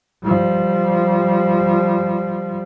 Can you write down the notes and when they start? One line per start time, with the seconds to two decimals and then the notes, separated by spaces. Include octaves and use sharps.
0.24 F3 G3